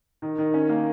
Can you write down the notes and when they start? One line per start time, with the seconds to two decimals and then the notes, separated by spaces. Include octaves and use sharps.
0.22 D#3
0.38 D#3
0.54 C#4
0.69 A#3